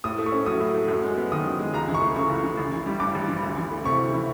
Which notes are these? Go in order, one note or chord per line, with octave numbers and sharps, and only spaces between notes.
A2 D#6
A3
C#6
C#4
F#3 D#6
A2
A3
F#2
G#3
B3
D#3 D#6
F#2
G#3
C#2 A#5
E3
C#6
A3
C#3 C#6
C#2
E3
A1
E3
G3
G2 D6
A1
E3
D2
E3
A3
C3 C#6
D2
E3